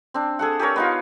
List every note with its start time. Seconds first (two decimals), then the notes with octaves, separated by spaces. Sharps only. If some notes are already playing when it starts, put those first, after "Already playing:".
0.14 C4 D4
0.39 G#4 A4 F#5
0.59 G4 G#4 A#4 C#5
0.76 B3 D#4 F4